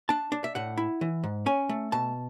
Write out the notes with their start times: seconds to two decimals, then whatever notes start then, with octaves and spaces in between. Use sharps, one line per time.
0.09 D4 A5
0.32 D4
0.44 E5
0.55 A2 F#5
0.77 E4
1.01 E3
1.24 G#2
1.46 C#4 G#5
1.69 A3
1.92 B2 A5